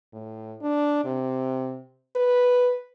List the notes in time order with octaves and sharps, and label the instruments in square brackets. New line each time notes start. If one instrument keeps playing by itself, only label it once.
[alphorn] A2
D4
C3
B4